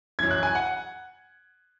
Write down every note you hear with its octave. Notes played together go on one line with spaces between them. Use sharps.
F#2 E3 G#6
F#6
G#5
F#5